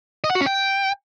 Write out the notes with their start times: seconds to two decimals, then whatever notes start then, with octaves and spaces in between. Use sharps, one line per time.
0.24 D#5
0.30 F#5
0.35 F#4
0.41 C#4
0.46 G5